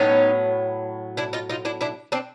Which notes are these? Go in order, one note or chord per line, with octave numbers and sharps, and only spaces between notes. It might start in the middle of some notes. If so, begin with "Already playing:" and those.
Already playing: A2 F#3 B3 C#4 D#4
D4 E4
D#4 F4
D#4 F4
D4 E4
D4 E4
C4 D4